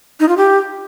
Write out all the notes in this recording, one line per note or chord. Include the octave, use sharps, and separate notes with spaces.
D#4
F4
G4